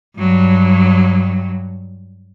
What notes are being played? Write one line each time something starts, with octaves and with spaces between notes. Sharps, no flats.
G2 F#3